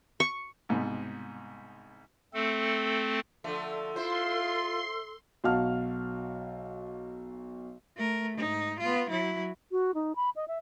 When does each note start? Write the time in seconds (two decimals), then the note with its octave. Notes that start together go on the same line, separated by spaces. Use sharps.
0.20 C#6
0.69 C2 G#2 B2
2.33 A3 C4 A4
3.44 D3 F3 A3 A4
3.96 E4 F4 C5 C6
5.44 B1 F#4 F5 A5 F6
7.96 A3 A#4
8.38 G#2 D#4
8.80 B3 F4
9.10 F#3 E4
9.72 F#4
9.94 D#4
10.16 B5
10.36 D#5
10.48 E5